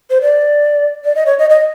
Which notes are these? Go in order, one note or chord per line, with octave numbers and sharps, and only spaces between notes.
C5
D5
D5
D#5
C#5
D#5
D#5